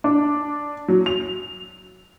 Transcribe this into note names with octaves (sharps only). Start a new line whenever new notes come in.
D4
F#3
F7